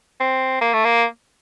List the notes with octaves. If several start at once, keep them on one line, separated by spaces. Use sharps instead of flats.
C4
A#3
A3
A#3